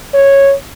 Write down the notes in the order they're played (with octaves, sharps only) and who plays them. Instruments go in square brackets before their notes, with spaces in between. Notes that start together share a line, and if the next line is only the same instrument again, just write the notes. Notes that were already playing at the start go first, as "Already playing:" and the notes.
[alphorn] C#5